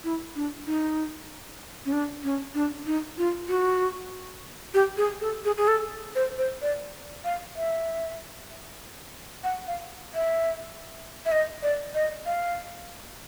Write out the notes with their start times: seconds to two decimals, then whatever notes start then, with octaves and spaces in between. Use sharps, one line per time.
0.04 E4
0.36 D4
0.67 D#4
1.86 C#4
1.92 D4
2.24 C#4
2.55 D4
2.86 D#4
3.18 F4
3.49 F#4
4.74 G4
4.97 G#4
5.21 A4
5.45 G#4
5.58 G#4
5.68 A4
6.15 C5
6.38 C5
6.62 D5
7.25 F5
7.56 E5
9.44 F#5
9.67 F5
10.15 E5
11.26 E5
11.32 D#5
11.63 D5
11.94 D#5
12.26 F5